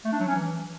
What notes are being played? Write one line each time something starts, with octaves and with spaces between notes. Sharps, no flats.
A3
D4
F#3
C#4
E3